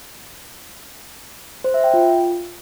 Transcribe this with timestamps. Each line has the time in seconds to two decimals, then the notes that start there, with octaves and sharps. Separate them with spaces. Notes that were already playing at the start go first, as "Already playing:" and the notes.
1.64 C5
1.74 E5
1.84 G5
1.94 F4